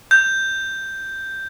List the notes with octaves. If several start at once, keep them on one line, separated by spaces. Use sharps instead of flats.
G6